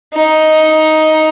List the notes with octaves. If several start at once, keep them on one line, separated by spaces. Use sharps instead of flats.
D#4